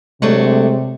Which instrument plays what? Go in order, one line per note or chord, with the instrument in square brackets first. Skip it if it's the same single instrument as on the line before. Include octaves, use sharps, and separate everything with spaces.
[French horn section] C3 [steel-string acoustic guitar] F#3 A3 D4 [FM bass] G#3